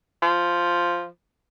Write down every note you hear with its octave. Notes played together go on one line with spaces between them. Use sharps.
F3